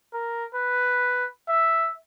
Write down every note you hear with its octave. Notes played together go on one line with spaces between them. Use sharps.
A#4
B4
E5